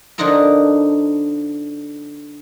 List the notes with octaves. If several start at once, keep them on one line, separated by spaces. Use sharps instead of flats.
D3 F3 D4 D#4 F4 A#4